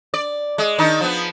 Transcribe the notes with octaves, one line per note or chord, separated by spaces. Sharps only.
D5
G#3
D#3 D4 D#4
F3 B3